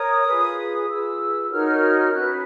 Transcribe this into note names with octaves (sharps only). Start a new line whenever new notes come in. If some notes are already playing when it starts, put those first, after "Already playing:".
Already playing: A#4 C#5 D#6
F4 G#4 B4
F4 G#4 B4 E6
D#4 F#4 A#4 C#5 F6
C#4 F#4 B4 F#6